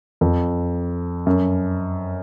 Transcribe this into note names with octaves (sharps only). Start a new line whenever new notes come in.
F2
F#2